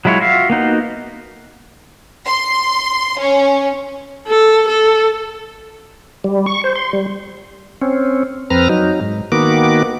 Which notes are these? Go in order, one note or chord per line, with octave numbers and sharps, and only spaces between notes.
F#3 G#3 E4 F4 C#5
F4 F#4 E5 F5
A#3 B3 D#4 F#4
C6
C#4
A4
A4
G3
C#6
C5
C6
G3
C4 C#4
F2 C4 B4 A#5 F6
F#3 D#4
G#2
D#3 A#3 B3 F#4 D6